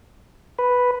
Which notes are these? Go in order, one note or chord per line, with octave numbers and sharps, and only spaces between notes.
B4